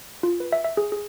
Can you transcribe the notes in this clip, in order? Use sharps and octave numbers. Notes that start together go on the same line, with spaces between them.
F4
B4
E5
E5
G#4
G#4